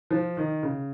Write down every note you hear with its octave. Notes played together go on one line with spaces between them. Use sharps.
F3
D#3
C#3